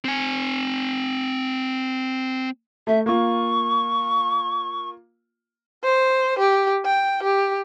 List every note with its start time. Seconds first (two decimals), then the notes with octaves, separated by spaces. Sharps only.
0.04 C4 G#5
2.87 A3 E5
3.06 A#3 F4 C#6
5.84 C5
6.39 G4
6.85 G5
7.23 G4